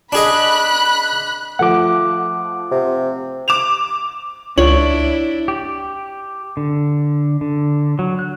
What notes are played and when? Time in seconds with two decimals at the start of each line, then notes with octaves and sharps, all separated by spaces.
0.12 D4 G#4 D#5 B5 F#6
1.59 F3 A3 F#5 D6
2.71 C3
3.48 D6 E7 F7
4.58 C#2 D4 E4 C#5 F#7
5.48 G4
6.57 D3
7.41 D3
7.99 F#3
8.19 F#6